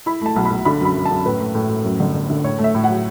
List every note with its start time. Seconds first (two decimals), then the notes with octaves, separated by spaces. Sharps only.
0.06 E4 B5
0.21 A3 A5
0.36 B1
0.45 B5
0.51 B1
0.65 D3 B5
0.81 F#2 B5
0.96 F#2
1.05 A5
1.11 F#2
1.25 A2 B4
1.40 A2
1.55 A2
1.69 A2
1.84 F#2
2.00 G1
2.14 G1
2.30 D3
2.44 A2 C#5
2.58 A3
2.64 E5
2.75 A2
2.84 F#5
2.89 F#3